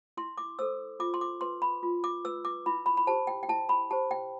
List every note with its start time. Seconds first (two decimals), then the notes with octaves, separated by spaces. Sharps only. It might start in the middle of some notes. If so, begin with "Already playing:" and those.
0.17 E4 C6
0.38 D6
0.59 A4 C5 E6
1.00 F4 D6
1.14 C6
1.21 D6
1.41 B4 C6
1.62 B5
1.83 F4
2.04 D6
2.25 B4 E6
2.45 D6
2.66 E4 B5
2.86 B5
2.97 B5
3.07 G4 C5 A5
3.27 G5
3.43 G5
3.49 E4 A5
3.69 B5
3.91 G4 C5 A5
4.11 G5